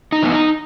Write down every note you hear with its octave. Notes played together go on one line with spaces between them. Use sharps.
D#4
E3 B3
D#4